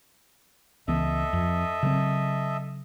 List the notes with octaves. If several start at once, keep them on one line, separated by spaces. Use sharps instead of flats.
C#2 E3 B3 A4 D#5 E5
F2
C#3 F#3 C4